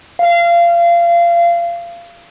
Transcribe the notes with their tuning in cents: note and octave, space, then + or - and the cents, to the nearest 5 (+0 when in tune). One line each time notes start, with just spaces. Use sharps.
F5 -25